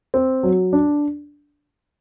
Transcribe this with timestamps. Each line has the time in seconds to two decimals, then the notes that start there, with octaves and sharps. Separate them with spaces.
0.14 C4
0.43 F#3
0.73 D4